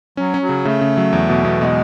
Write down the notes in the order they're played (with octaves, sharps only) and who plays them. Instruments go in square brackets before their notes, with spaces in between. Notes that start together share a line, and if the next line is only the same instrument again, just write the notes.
[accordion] F#3 [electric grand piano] C#4
[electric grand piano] C#4
[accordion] F#3
[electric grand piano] C#3
[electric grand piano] C#3 [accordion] A3
[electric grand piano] C#3
F#3
E2
B2
B2
[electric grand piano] B2 [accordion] G#3